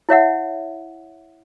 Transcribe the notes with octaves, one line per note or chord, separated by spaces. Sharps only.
E4 C#5 E5 F#5